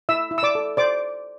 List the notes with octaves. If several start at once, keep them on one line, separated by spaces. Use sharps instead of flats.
E4 E5 E6
E4
E6
D5 D6
A4
C5 D5 D6